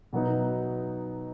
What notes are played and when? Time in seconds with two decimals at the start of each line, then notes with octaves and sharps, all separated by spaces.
0.13 B2 F#3 B3 D#4